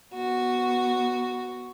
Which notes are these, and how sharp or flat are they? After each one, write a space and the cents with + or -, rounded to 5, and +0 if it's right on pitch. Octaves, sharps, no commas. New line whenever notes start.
B3 -10 F#4 +0